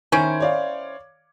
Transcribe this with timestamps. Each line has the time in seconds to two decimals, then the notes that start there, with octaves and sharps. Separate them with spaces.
0.12 D#3 C#4 E4 C5 G#6 D7
0.40 C#5 D5 F5